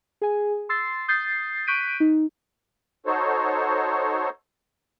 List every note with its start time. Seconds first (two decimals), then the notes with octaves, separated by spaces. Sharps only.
0.21 G#4 G#5
0.69 C6 E6 A6 C7
1.08 D#6 G6 A6 C7
1.67 C#6 F#6 G6 B6 D7 D#7
2.00 D#4
3.06 D#4 F#4 A4 C5 C#5